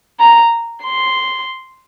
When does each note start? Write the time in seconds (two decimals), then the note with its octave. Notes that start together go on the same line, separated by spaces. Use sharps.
0.20 A#5
0.85 C6